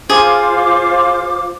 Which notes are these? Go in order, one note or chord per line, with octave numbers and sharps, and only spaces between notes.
F4 G#4 C5 D6